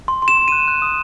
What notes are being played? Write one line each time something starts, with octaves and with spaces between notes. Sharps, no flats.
C6
C6
E7
C6
F#6 D#7
F#6
D#6